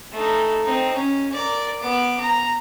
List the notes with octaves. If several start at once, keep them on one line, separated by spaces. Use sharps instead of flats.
A3 D#4
C4 D#4
C#4
A#4 D5
B3 D6
A#5